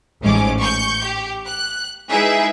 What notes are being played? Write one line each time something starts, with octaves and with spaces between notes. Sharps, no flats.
A1 G#2 C#4 D6
C#6 G6
G4
F#6
G#3 D#4 E4 G#4 B4 E5